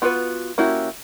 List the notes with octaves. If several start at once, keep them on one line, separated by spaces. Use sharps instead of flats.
B3 F4 F#4 A#4 B4
A#3 C#4 E4 F#4 G4